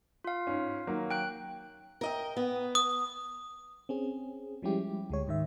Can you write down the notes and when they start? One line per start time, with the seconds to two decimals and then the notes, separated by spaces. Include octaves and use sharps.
0.24 F4 F5
0.47 G#2 C#4
0.87 D#3 F#3 A#3
1.11 G5 F#6 D7
2.01 A#4 D#5 G5
2.37 B3
2.75 D#6
3.89 C4 C#4 G#4
4.62 F3 G3 G#3 C#4 E4 G4
5.10 D2 G#3 C#5
5.27 G#2 D#3 E5